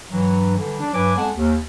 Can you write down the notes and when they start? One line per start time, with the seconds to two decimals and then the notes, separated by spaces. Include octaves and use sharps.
0.12 G2 E3 F#3
0.57 D3 E3 G3
0.80 D4
0.94 G2 F#3 B4 G#5 D6
1.16 F2 G#3 B3 F#5 G#5 A5
1.35 D#2